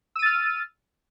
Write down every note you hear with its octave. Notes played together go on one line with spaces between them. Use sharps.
E6 F6 A6 D#7